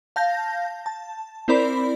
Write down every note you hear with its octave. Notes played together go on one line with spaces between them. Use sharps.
F5 A5 G6 A#6
A5
C4 E4 A#4 C5 D5 B5